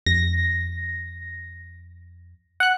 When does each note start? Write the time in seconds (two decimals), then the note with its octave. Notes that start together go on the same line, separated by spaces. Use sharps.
0.06 F2 A#6
2.60 F#5 F#6